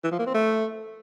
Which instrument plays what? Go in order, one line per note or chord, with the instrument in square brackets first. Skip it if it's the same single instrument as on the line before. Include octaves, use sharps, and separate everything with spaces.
[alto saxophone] E3
F3
A#3
C4
A3